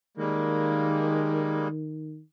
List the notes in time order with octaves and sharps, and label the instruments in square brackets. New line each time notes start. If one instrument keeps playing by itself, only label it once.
[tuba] D#3 [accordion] G3 G#3 A#3